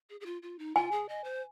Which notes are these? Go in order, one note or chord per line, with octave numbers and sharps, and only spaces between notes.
G#4
G#4
F4
F4
D#4
F4 G#5
G#4
D#5
C5